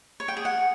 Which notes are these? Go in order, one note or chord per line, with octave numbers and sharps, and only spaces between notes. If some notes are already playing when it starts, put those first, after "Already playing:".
C#5
G5
G#4
F#5